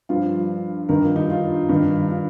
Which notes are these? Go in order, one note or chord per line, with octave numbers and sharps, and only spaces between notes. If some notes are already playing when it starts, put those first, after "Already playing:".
G2 F3 F4
G2 D#3 A#4
F4
D#4
F4
G2 D#3
F4